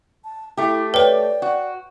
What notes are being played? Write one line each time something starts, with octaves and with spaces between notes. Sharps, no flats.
A5
A3 E4 G4
B4 C#5 D5 G5
F#4